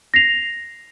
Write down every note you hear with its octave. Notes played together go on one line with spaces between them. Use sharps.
A#6 C7 F7